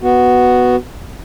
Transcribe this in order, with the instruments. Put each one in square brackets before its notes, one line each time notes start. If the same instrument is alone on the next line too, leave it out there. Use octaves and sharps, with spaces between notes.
[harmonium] B3 F#4